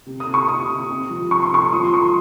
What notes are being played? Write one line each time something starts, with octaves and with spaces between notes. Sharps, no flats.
C3
D#6
C3
C#6
C3 D#6
C3
C3
F3
C3 C#6
C6
C3 C#6
F3 D#6
C6
F3 C#6